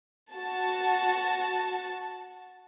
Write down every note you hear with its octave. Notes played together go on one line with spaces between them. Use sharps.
F#4 A5